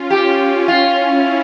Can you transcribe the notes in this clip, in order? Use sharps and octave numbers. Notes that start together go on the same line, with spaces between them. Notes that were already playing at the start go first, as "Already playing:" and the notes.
Already playing: C#4 F4
C#4 G4
C#4 F4
E4